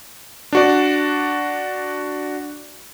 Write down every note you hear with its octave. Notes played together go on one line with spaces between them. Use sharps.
D4 F#4 D5